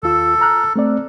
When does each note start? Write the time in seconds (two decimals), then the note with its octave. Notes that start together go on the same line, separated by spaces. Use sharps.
0.03 D#2 F4 A4 E6
0.41 A#5 F6 F#6
0.76 A3 C4 D5